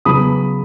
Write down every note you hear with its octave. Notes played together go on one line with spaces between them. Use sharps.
C#3 F#3 B3 B5 D#6